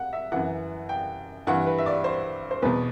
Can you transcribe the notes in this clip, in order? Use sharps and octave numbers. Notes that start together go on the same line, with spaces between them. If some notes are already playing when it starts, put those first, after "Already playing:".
Already playing: F#5
E5
F#2 E3 F#5
G5
G2 E3 F#5
B4
E5
D5
C5
C5
E2 B2 B4